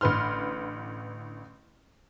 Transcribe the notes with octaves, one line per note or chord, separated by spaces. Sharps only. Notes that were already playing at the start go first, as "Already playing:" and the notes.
A1 D3 B4 C6 F6